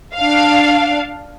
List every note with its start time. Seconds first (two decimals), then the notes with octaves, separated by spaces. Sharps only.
0.17 D4 F5